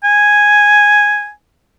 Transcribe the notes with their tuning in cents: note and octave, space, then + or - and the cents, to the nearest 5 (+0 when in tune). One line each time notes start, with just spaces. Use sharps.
G#5 +0